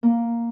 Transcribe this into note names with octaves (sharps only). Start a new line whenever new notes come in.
A#3